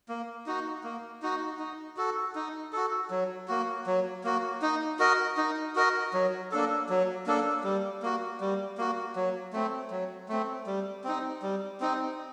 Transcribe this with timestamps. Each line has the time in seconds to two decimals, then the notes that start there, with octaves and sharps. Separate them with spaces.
0.09 A#3
0.46 D#4 F#4
0.84 A#3
1.22 D#4 F#4
1.59 D#4
1.97 F#4 A4
2.35 D#4
2.73 F#4 A4
3.11 F#3
3.48 A#3 F#4
3.87 F#3
4.24 A#3 F#4
4.62 D#4
4.99 F#4 A#4 D#5
5.37 D#4
5.76 F#4 A#4 D#5
6.14 F#3
6.52 A#3 D4 A4
6.89 F#3
7.26 A#3 D4 A4
7.64 G3
8.03 A#3 F#4
8.41 G3
8.78 A#3 F#4
9.16 F#3
9.53 A3 C4
9.91 F#3
10.29 A3 C4
10.67 G3
11.04 C4 D#4
11.42 G3
11.80 C4 D#4